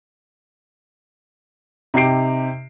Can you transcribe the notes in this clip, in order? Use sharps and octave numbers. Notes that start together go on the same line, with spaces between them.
C3 D#4 G4 C7 D7